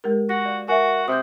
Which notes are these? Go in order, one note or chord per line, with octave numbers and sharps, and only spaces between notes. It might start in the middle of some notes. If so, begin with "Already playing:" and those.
G#3 G4 A#4
F#4 A#6
D5 F5
F#4 A#4 E5 G#5
C3 D#6 G6